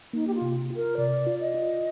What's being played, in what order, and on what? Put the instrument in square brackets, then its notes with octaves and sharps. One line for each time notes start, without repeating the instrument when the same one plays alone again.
[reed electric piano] A#3 [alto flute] D#4
[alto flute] G4
F4
[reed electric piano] C3
F4
[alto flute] A#4
[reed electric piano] C3 [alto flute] D5
[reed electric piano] F4
[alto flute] D#5
[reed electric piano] F4